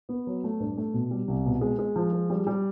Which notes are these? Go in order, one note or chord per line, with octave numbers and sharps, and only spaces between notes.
B3
F#3
A3
G2
A3
B2
G3
C2
B2
G#3
G#3
F3
G#3
G3
G3